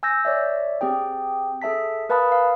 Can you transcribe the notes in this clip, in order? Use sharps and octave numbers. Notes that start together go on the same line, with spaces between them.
G#5 E6 G6 A#6
C#5 D5 E5
C4 G4 G#4 G5
G#4 A4 E5 A5 B6
A#4 B4 F5 A5 B5 D#6
F5